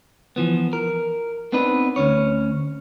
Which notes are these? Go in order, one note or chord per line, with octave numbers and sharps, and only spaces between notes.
E3 F3 B3
A#4
B3 C4 D4 D#4 B4
D2 C#4 C#5